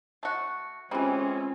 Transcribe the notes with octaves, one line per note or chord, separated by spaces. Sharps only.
A3 F#4
E3 G3 G#3 C4 C#4 F4